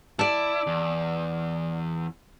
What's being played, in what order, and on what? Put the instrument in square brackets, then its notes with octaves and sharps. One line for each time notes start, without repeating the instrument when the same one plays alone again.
[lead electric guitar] E4 [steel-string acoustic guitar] D5 A5
[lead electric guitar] E2